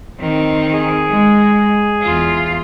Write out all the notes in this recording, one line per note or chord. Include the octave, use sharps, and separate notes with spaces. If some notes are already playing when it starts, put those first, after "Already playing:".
D#3 C4
G#4
G#3
E2 F4